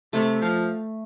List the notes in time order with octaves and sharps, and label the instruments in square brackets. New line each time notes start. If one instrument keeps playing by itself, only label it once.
[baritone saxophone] C3 [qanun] A3
[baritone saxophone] F3